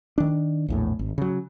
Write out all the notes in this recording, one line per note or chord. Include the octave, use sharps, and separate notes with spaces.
D#3 D4
A#1 E2 A2
G#1
C#3 F#3